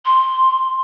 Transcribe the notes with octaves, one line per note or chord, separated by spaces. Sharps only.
C6